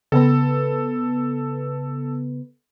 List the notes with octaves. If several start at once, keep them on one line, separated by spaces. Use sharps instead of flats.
C#3 B3 A4 B4